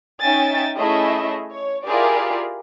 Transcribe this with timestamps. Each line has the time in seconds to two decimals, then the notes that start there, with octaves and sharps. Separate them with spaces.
0.20 C#4 D#4 E5 G5 G#5 A6
0.78 A3 C#4 E4 G#4 D#5 E5
1.50 C#5
1.84 E4 F4 G4 G#4 A#4 D5